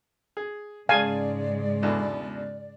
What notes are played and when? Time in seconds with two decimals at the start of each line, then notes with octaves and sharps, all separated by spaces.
0.37 G#4
0.89 G#2 C#3 G#3 G#4 D5 F5 G#5 A5
1.83 E2 B2 D3